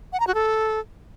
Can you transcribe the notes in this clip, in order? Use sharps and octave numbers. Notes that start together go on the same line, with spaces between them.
F#5
A#5
F#4
A4